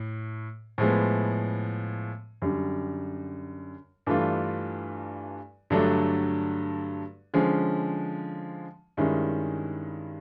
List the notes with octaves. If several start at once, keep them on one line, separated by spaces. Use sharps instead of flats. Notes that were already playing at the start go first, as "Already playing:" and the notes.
Already playing: A2
A2 F3 G#3 B3
F#2 D3 G3
G2 E3 A3 D4 F4
G2 D3 F#3 A3 D4
D3 F3 G#3 C#4
G2 D#3 G#3 C#4 E4